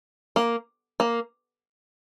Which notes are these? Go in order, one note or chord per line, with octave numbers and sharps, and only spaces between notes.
A#3
A#3